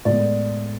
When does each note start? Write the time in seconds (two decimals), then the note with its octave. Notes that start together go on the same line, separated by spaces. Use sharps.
0.05 A2 G#3 B3 D5